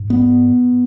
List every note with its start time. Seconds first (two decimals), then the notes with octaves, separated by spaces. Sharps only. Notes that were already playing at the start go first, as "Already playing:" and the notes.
Already playing: G#2
0.10 B3